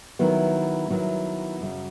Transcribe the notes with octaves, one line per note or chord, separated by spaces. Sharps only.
D#3 F#3 B3 E4
D#3 F#3 B3 E4
F#2 C#3 F#3